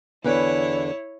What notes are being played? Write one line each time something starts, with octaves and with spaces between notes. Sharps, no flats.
E2 D3 E4 B4 C#5